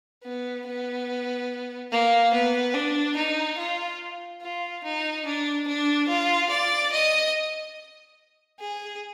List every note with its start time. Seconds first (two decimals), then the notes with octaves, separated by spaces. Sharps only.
0.24 B3
0.66 B3
1.92 A#3
2.34 B3
2.74 D4
3.17 D#4
3.58 F4
4.42 F4
4.84 D#4
5.26 D4
5.67 D4
6.09 F4
6.50 D5
6.92 D#5
8.60 G#4